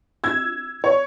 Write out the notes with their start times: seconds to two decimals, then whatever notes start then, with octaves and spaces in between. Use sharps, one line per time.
0.24 E6 G#6
0.84 C#5